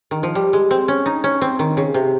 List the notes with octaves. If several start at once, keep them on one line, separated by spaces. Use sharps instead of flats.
D#3
F3
G3
G#3
C4
C#4
D#4
C#4
C4
D#3
C#3
C3